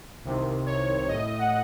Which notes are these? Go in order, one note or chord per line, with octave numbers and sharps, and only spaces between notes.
C2 C3 D#3
C#5
A2 A3 D#5
F#5